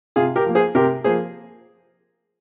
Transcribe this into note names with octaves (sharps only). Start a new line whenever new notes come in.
C3 F4 G#4
G4 A#4
F3 A#3
G#4 C5
C3 G4 A#4
F3 A#3 G#4 C5